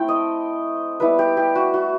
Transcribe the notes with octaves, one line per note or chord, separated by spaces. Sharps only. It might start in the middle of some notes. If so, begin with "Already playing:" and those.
Already playing: A3 C4 E4 G5
D#5
G3 B3 E4 B4
G4
G4
F#4
F#4